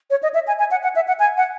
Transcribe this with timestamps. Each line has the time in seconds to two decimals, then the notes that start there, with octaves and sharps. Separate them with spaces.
0.10 C#5
0.23 D#5
0.34 E5
0.47 G#5
0.59 G#5
0.71 F#5
0.83 F#5
0.96 E5
1.08 F#5
1.20 G#5
1.37 F#5